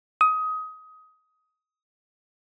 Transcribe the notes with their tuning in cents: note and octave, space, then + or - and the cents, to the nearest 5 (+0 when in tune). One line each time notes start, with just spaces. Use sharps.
D#6 +20